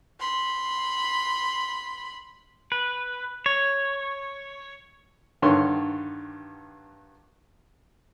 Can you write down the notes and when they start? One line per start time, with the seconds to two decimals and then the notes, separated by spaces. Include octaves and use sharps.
0.20 B5 C6
2.72 B4
3.46 C#5
5.42 G2 D3 D#3 C#5 C6